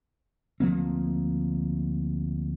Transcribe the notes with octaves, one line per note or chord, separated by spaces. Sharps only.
D2 F3 A#3 C4